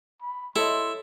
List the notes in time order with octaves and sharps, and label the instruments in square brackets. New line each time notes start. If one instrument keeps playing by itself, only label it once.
[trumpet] B5
[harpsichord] E4 [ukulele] A4 C#5 D#5 [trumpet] C6